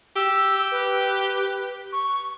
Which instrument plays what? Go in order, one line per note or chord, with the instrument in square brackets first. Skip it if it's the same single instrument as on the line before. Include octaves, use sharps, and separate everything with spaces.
[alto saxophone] G4 [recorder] E6
[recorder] B4
C#6